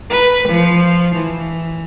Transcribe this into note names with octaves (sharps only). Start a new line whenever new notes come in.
B4
F3
E3